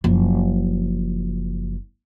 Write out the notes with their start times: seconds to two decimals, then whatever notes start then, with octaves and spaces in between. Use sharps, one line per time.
0.04 F#1 F3